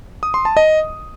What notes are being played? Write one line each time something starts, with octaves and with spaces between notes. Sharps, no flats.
D#6
C6
A5
D#5